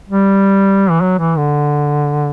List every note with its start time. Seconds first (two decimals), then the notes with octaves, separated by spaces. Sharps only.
0.09 G3
0.90 E3
1.01 F#3
1.19 E3
1.37 D3